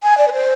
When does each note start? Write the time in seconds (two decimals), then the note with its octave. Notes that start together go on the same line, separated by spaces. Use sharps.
0.03 G#5
0.18 D5
0.28 B4
0.33 C5